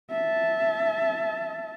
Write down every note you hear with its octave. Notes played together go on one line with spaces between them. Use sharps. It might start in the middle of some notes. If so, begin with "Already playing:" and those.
E5 A5